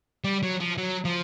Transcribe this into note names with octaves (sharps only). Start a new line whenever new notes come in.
G3
F#3
F3
F#3
F3